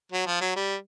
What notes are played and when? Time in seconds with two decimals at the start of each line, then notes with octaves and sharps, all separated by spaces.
0.12 F#3
0.26 F3
0.41 F#3
0.56 G3